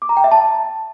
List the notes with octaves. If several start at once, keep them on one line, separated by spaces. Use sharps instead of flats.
D6
A#5
G5
E5
A5